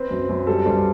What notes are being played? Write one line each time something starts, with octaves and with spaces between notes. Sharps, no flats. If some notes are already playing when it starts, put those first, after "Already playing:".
Already playing: C4 B4
F#2
F#2
G3 A4
G2 C5